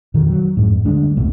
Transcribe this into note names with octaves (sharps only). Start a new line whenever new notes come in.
F2 B2 D#3
F#3
F2 G#2
D2 G3 G#3 D4
C2 F2 B2 A3